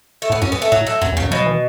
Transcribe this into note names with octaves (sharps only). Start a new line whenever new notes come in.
A3
A2 B3
F#2 C#4
B3
A3
A2 F#3
A3
F#2 F#3
E2
C#3
F#2
B2 F#3
E3